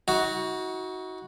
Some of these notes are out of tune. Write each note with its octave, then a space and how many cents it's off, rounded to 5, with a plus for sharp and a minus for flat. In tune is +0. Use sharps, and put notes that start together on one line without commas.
D#4 +45 F#4 +0